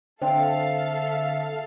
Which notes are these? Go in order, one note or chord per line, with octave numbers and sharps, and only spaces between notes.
D3 C4 A4 E5 F5